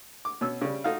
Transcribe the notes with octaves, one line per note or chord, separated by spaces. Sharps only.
D6
B2 C#4 E6
C#3 G3
A3 D#4 F4 F#4 F5